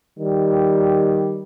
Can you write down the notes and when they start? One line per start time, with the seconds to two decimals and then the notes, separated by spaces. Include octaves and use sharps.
0.18 D#3 G3